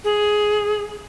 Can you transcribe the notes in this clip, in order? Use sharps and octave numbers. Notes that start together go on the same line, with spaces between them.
G#4